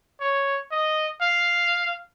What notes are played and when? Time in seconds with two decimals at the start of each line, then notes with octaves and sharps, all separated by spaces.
0.21 C#5
0.71 D#5
1.22 F5